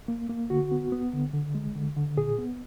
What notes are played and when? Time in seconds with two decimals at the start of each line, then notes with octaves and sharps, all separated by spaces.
0.08 A#3
0.29 A#3
0.50 D3 F#4
0.72 B3
0.92 B3
1.13 D3
1.33 D3
1.55 G#3
1.76 D3
1.96 D3
2.17 A#2 G#4
2.38 B3